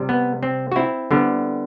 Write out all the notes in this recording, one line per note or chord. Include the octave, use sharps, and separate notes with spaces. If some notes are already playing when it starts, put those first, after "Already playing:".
Already playing: C3 G3
B3
C4
F#4
C4 E4
D3 G3 B3